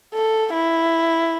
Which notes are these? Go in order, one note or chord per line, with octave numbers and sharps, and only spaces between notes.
A4
E4